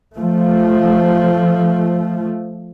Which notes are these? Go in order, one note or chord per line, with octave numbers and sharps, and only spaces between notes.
F3 A3